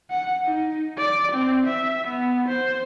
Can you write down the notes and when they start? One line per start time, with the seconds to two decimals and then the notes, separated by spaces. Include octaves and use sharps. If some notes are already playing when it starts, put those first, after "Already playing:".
0.10 F#5
0.43 D#4
0.98 D5
1.32 C4
1.66 E5
2.07 B3
2.48 C5